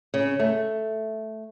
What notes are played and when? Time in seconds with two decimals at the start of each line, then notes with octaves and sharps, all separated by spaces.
0.14 C#3
0.40 A3